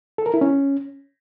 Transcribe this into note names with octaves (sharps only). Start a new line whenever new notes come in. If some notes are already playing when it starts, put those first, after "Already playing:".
A4
A#4
E4
C#4